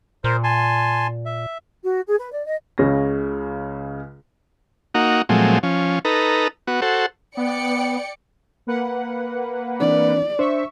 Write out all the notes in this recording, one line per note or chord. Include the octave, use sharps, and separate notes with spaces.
A#2 A#4 C5
G#5 A5 C6
E5
F#4
G#4
B4
D5
D#5
C#2 C#3 C#4 A#6
A#3 D#4 F#4
A#2 F3 F#3 G#3 A3 C4
F3 C#4
D#4 A4 B4 A#5
B3 F#4
F#4 A4 C5
B3 D5 G5 C#7
A#3 B4 F#5
E3 C4 D4 D5
D4 C5 E5 C#6